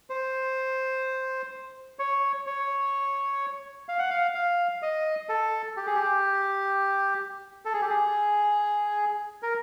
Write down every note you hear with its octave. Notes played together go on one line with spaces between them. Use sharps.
C5
C#5
C#5
F5
F#5
F5
F5
D#5
A4
G4
G#4
G4
A4
G#4
G4
G#4
A#4